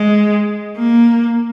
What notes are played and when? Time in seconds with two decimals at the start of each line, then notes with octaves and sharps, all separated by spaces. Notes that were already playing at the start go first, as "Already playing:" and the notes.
Already playing: G#3
0.77 A#3